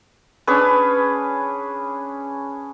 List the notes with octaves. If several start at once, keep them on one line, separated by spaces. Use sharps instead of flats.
C#4 D4 G#4 B4